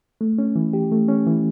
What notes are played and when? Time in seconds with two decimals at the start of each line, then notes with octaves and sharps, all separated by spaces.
0.21 A3
0.38 C#4
0.56 E3
0.73 G4
0.92 A3
1.08 C#4
1.26 E3